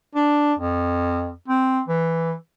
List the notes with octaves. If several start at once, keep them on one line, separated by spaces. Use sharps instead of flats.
D4
F2
C4
E3